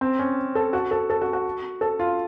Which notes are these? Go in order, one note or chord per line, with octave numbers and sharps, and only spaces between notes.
C4
C#4
A4
F#4
A4
A4
F#4
F#4
A4
F4